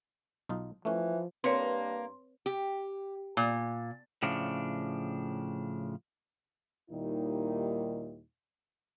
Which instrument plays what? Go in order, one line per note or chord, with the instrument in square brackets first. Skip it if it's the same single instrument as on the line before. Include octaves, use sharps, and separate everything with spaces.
[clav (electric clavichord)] B1 D#4 F4
[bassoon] E3 [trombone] F3 [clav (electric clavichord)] A3 C#4
[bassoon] G2 [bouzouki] A#3 [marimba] C4 B4 C#5 [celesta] C6
[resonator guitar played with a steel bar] G4
A#2
[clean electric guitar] A2 C#3 F3 D4
[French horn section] D#2 A#2 D#3 G3 D#4 E4